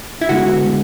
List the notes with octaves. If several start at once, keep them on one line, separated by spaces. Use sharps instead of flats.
E4
D3 G#3 B3 F#4
D3 G#3 B3